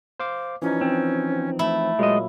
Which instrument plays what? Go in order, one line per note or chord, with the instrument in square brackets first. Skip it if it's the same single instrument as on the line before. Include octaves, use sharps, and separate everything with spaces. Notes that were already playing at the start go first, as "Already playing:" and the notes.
[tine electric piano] C5 F5 D6
[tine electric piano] E3 F3 D#4 [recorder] C#4
[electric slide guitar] C4
[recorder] A3 [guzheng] E4
[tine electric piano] A#2 F#3 A#3 [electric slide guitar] G#3 D#5